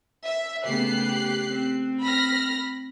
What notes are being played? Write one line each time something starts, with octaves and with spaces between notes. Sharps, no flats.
E5
C#3 A3 B3 G4 F#6 C7
C4
B5 F6 A#6